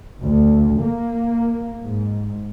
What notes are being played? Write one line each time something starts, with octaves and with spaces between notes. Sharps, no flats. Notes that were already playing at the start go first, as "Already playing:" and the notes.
D2
A#3
G#2